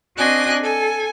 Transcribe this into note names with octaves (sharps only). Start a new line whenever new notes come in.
C4 D4 F#4 D#5 G#5 F#6
A4 G#5